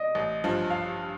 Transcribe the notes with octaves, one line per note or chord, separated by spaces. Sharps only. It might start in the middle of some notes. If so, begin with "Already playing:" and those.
Already playing: D5 D#5
A1
G2 F3
F5